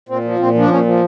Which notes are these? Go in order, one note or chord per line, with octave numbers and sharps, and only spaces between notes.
A#2 C4
F3
A#2 C4
F3 D4
A#2 C#4
F3